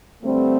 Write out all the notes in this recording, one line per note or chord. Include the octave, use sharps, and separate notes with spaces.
G2 D3 G3 A3 C4